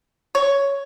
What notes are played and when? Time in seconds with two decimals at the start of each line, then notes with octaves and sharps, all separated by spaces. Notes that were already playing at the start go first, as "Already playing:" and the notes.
0.35 C#5